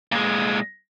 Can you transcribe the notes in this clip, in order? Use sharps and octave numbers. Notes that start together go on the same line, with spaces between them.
A#2 G#3